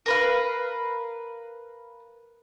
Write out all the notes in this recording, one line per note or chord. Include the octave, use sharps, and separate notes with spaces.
A#4 B4 F5